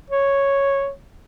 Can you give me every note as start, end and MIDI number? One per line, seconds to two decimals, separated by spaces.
0.10 0.91 73